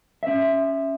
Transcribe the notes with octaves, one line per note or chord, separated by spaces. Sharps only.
C#4 E5